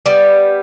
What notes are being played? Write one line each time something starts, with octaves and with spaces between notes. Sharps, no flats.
G3 B3